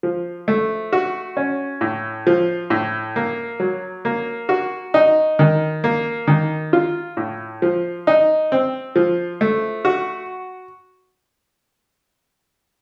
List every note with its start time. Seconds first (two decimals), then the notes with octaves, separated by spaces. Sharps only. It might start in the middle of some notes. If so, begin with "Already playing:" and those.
0.03 F3
0.48 A3
0.93 F#4
1.37 C#4
1.81 A2
2.27 F3
2.70 A2
3.16 A#3
3.60 F#3
4.05 A#3
4.49 F#4
4.94 D#4
5.39 D#3
5.84 A#3
6.27 D#3
6.73 F4
7.17 A2
7.62 F3
8.07 D#4
8.52 C4
8.96 F3
9.41 A3
9.85 F#4